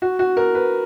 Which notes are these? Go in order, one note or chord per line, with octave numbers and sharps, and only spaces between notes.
F#4
F#4
A#4
B4